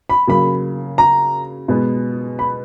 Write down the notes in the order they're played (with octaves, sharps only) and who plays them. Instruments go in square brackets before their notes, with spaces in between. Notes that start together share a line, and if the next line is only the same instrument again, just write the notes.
[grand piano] B5
[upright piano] C#3 F#3 A#3 [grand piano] B5
[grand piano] A#5
[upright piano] B2 G#3 B3
[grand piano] B5